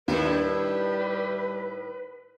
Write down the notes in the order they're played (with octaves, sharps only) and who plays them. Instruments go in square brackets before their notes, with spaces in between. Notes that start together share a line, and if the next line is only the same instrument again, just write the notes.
[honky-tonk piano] D#2 [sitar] A2 D#3 E4 [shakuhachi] B4
[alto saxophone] G3 [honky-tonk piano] D4